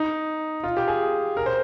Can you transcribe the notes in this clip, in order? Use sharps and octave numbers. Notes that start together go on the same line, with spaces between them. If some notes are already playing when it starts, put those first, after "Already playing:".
Already playing: D#4
F4
G4
G#4
A#4
C5